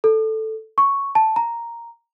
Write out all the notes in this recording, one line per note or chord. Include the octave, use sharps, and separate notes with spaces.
A4
C#6
A5
A#5